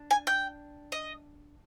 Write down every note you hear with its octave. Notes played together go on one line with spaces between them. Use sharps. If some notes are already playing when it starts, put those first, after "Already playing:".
Already playing: D4
G#5
G5
D#5